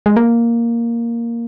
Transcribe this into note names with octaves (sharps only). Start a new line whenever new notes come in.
G#3
A#3